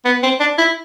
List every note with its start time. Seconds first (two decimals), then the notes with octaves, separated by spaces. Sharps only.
0.05 B3
0.23 C4
0.40 D4
0.58 E4